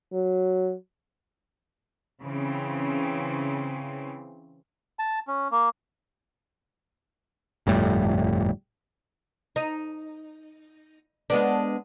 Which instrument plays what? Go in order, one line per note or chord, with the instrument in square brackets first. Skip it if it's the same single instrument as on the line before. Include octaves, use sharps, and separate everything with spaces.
[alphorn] F#3
[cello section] C#3 E3 C4
[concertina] A5
C#4
A#3
[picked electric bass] G1 F2 A2 G3
[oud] D#4
G#3 B3 D4